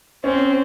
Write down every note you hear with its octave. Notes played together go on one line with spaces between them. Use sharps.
C4 C#4